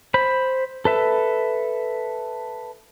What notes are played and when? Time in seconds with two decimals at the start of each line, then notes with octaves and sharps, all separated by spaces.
0.14 C5 B5
0.85 A4 B4 E5